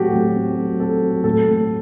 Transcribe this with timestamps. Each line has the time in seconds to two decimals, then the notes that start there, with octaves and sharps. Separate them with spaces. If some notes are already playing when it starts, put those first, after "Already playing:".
Already playing: A2 F#3 C4 F#4 G4 A4
0.12 A2
0.35 C4
0.57 F#3
0.80 C4 A4
1.02 F#3
1.24 A2 A4
1.47 A2